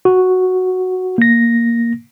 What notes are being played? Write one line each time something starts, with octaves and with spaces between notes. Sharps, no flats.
F#4
A#3 A#6